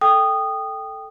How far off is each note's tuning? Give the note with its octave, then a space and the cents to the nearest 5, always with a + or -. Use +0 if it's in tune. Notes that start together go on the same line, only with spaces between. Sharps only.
A4 +0 G5 +0 D#6 -15